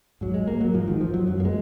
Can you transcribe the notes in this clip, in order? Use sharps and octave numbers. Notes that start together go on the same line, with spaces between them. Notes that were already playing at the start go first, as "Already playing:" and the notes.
G#2 F#3
G#3
A#3
F#3
G#2 F3
D#3
F3
F#3
F#2 F#3
A#3
G#3